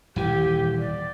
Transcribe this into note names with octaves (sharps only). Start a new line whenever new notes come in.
D#1 E3 G4
D5